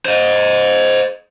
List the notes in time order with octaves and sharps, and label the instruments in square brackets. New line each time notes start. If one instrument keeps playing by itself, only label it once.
[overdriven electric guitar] C5 D#5